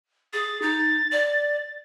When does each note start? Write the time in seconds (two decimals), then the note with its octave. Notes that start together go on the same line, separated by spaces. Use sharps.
0.33 G#4 A6
0.62 D#4 A6
1.12 D5